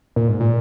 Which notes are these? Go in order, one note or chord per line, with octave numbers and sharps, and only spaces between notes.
A#2
G#2
A#2